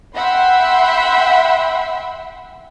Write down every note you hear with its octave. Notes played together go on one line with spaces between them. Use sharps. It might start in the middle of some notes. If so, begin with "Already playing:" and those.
E5 F#5 G5 B5 C6